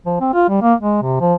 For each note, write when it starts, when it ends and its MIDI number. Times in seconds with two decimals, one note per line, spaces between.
0.06 0.16 53
0.20 0.29 60
0.34 0.49 65
0.49 0.61 55
0.62 0.74 58
0.80 1.02 56
1.02 1.16 48
1.21 1.34 53